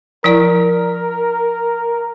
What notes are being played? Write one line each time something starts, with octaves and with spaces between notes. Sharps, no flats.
F3 E4 A#4 D5